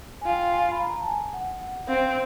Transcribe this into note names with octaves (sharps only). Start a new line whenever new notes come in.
G#5
F4 G5
G#5
B5
A#5
A5
G#5
F#5
F#5
F#5
C4 F5